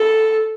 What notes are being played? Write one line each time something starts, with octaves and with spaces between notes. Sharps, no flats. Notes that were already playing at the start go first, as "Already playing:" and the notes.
Already playing: A4